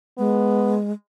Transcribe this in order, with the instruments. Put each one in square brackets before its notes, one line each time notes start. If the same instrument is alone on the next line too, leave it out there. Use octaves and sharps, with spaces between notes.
[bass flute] G#3 [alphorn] B3